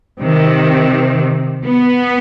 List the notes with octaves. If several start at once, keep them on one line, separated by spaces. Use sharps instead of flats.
C3 D#3
B3